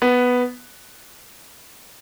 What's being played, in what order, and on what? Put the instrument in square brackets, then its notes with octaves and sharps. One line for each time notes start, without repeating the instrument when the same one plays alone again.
[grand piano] B3